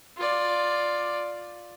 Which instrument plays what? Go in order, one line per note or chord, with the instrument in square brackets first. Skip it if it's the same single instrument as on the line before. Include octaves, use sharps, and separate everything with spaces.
[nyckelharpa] F4 D5